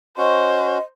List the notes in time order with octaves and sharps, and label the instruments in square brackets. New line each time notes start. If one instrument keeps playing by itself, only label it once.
[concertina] C#4 F#4 [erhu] C5 [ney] D#5